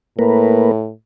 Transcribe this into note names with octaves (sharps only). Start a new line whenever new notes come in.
A2 A#3 A#4 B4